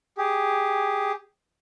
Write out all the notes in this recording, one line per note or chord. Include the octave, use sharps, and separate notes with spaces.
G4 G#4